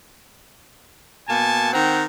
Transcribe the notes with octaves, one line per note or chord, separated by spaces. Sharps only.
B2 A#3 G#5 A5
D#3 C4 F#5 A#5